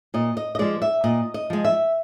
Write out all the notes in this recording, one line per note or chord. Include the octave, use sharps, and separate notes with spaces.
A#2 D#5
D#5
D#5
F3 G#3 D5
E5
A#2 D#5
D#5
F3 G#3
E5